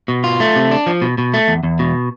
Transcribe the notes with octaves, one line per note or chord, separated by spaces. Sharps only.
B2
F4
A3
C3
D4
F3
B2
B2
A3
E2
E2
B2